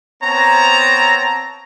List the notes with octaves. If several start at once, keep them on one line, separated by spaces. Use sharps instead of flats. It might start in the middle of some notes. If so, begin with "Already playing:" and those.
B3 C4 C#5 A5 A#5